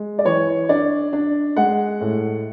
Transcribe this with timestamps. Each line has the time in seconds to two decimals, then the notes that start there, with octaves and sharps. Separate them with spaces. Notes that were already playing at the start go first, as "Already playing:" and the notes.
Already playing: G#3
0.19 D5
0.25 E3 C#5
0.69 D4 D5
1.13 D4
1.56 G#3 F#5
2.01 A2